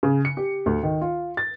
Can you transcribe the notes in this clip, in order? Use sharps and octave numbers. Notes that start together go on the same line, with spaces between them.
C#3
C#7
G4
D2
D#3
F4
A6